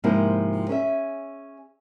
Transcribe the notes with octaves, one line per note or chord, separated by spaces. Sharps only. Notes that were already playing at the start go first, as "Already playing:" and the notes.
G#2 C3 F3 A#3 C4 E4
C#4 G#4 E5